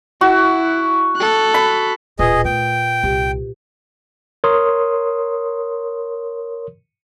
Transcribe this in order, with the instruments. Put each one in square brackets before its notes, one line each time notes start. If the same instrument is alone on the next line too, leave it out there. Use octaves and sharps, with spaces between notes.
[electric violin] E4 [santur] F#4
[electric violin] A4 F#6
[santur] B5
[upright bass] D1 A#2 [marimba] F4 B4 D#6 [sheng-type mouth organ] G#4 D#5
[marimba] A#2 [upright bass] A3 [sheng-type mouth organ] G5
[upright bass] C2 [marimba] G4
[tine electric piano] A#4 C#5 C6 D#6